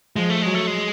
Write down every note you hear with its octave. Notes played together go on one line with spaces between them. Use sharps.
F3 G#3
A3
F#3 G#3
A3
G#3